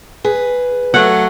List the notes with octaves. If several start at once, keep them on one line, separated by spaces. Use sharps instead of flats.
G#4 B4
F#3 A3 F#5